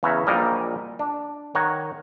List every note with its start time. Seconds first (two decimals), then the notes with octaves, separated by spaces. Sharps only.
0.03 E2 C#3 B4 C#5 E5 A#5
0.27 A#1 A#2 F#3 G3 A#4 D#5
0.99 D4
1.55 D#3 C#5 D#5 F#5 A#5